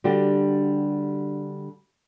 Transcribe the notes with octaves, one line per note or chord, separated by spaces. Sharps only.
D3 G3 D4 F#4 G4